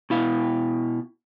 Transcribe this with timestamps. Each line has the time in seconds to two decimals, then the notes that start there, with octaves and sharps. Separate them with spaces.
0.10 B2 E4 F5